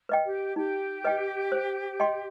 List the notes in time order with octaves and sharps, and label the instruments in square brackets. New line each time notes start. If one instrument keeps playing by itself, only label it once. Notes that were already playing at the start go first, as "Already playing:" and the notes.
[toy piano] B4 D#5 G5
[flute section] G4
[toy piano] D#4 [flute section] G4
[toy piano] B4 D#5 G5
C5
D#5 G5 C6